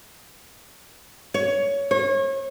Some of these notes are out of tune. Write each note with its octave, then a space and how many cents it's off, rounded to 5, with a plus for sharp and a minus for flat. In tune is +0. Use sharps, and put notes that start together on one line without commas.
C#5 +15
C#5 -35